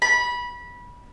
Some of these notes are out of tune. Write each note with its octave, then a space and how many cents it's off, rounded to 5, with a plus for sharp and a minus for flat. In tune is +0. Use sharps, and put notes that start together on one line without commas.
B5 -20